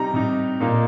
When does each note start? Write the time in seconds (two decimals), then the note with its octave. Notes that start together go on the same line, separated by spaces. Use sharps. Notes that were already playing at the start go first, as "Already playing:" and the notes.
Already playing: C3 G3 D#4 A#5
0.14 C3 G3 D#4
0.60 A#2 A#3 D#4